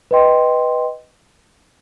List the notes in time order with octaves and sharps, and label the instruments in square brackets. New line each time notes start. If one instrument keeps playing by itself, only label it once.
[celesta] B4 D#5 G5 C6